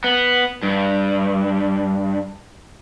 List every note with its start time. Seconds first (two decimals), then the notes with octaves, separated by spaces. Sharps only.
0.04 B3
0.63 G2